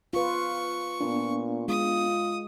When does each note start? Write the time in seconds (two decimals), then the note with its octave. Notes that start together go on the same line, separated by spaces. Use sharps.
0.13 F4 B4 C#6
1.01 A#2 B3 D4
1.68 G#3 F4 D#6